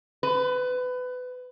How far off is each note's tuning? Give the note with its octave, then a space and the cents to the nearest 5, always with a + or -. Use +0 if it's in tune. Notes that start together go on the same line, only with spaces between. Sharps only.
B4 +25